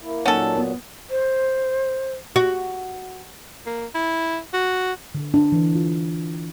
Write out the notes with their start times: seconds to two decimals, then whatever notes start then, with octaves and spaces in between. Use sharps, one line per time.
0.02 A#3 E4
0.26 A#2 F#3 A#3 C#4 D#4 A4 F#5
0.57 B3
1.10 C5
2.36 F#4
3.66 A#3
3.95 E4
4.53 F#4
5.15 D3
5.34 D4
5.52 E3
5.75 F4